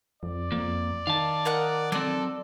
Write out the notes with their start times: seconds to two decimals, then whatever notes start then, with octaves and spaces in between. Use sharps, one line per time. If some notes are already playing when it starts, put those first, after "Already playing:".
0.23 F2 D5
0.52 F2 A#3
1.07 D#3 F5 A5
1.45 A#4 D#5 F#5
1.92 F#3 C4 A4 D5